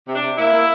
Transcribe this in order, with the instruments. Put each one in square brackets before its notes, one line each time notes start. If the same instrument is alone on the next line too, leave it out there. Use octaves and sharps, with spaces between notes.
[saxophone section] C3
D4
C3
A#3 E4
A#3